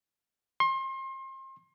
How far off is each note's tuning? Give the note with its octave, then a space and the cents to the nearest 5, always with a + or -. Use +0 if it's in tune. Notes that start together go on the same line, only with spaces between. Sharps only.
C6 +35